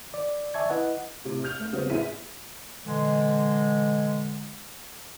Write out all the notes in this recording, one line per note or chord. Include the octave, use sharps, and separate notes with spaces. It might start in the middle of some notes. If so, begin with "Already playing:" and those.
D5
D5 E5 G#5 A5 C#6 G#6
E4 B4 D#5 F#5
A2 C3
F6 G6 F7
A3
C#3 F#3 G3 B3 C4
A1 E4 G#4 B6 D#7
A#2 D3 E3 G#3